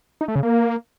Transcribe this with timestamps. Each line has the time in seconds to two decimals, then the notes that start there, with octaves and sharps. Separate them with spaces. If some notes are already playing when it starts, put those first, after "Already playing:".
0.21 D#4
0.28 A3
0.35 C#3
0.43 A#3